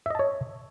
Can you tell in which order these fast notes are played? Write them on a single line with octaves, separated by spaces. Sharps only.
E5 D#5 A5 C#5